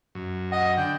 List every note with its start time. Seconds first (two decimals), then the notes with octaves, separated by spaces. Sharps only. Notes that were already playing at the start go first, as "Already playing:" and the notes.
0.15 F#2
0.52 D#5 F#5
0.77 D3 G5